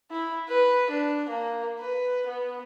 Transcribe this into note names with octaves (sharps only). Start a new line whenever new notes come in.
E4
B4
D4
A#3
B4
B3